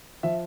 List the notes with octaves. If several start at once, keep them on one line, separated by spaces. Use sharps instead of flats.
F3 E5